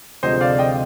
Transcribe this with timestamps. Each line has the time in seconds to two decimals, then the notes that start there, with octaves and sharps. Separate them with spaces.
0.23 D2 C3 F3 G#3 C5 D#5
0.41 D5 F5
0.59 D#5 G5